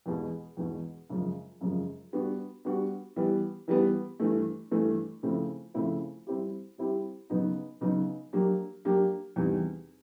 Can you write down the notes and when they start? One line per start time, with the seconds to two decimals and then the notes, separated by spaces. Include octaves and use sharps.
0.06 E2 B2 G#3
0.57 E2 B2 G#3
1.10 F#2 C#3 F3 G#3
1.61 F#2 C#3 F3 G#3
2.13 G3 B3 D4 F#4
2.65 G3 B3 D4 F#4
3.16 E3 G3 B3
3.68 E3 G3 B3
4.20 G2 E3 A3
4.71 G2 E3 A3
5.23 C#3 F3 A3 C4 E4
5.74 C#3 F3 A3 C4 E4
6.27 G3 C4 E4 G4
6.78 G3 C4 E4 G4
7.30 C#3 F#3 B3 D#4
7.81 C#3 F#3 B3 D#4
8.33 F#3 A#3 D4 G4
8.85 F#3 A#3 D4 G4
9.36 E2 C3 D#3 G3